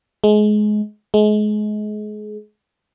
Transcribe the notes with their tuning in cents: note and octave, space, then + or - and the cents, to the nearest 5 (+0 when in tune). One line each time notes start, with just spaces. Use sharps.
G#3 +25
G#3 +30